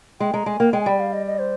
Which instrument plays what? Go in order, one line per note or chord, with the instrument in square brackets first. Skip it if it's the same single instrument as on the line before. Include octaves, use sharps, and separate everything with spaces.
[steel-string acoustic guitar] G#3 [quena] G5
[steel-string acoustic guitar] G#3 [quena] A#5
[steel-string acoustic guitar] G#3 [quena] G#5
[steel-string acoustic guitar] A#3 [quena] G5
[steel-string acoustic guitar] G#3 [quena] G5
[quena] G#5
[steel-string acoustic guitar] G3 [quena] G5
[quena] F5
D#5
D#5
C5